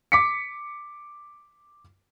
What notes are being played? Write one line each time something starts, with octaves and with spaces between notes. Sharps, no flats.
D6 B6 C#7